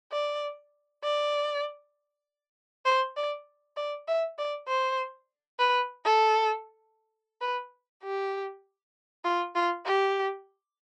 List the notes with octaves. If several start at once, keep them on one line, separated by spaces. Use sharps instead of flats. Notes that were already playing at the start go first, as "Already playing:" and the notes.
D5
D5
C5
D5
D5
E5
D5
C5
B4
A4
B4
G4
F4
F4
G4